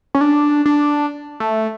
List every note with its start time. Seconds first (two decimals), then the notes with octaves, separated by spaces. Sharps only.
0.15 C#4
0.21 D4
0.66 D4
1.40 A3